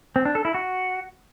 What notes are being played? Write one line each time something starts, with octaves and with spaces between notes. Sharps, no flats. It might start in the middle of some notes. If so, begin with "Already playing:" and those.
C4
D4
A4
E4
F#4